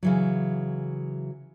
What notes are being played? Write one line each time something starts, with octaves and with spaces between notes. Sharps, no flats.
C#3 E3 F#3